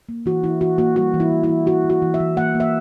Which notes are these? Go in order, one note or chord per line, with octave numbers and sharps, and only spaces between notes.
A#3
E3 F#4
E3 E4
E3 F#4
A#3 F#4
G3 F#4
E3
E4
E3
E4
E3
E4 F#4
E3
F#4
E3
E5
E3
A#3 F#5
A#3
E5